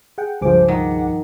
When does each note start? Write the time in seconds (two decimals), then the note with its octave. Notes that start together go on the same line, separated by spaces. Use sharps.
0.18 G#4 F#5 G5
0.41 C#2 G2 F3 G#4 C5 D6
0.68 D#3 F#5